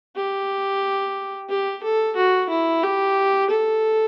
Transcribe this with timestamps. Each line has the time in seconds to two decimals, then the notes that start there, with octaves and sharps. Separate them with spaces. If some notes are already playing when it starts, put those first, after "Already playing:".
0.16 G4
1.49 G4
1.83 A4
2.16 F#4
2.50 E4
2.83 G4
3.50 A4